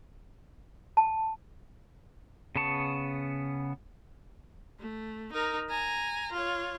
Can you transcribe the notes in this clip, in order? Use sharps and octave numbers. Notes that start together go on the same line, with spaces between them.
A5
C#3 B3 A5 C#6
A3
D#4 A#4
G#5 A#5
F4 C#5